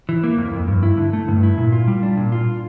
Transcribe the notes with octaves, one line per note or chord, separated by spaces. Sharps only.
E3
A#3
F2
F2
G2
E4
D3
A3
G2
E4
A#2
F4
G3
D4
A#2
F4